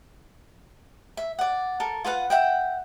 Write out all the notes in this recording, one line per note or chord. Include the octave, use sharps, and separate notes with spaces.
E5
D5 F#5
A4 A#4
F4 B4 F5 F#5
E5 F#5 G5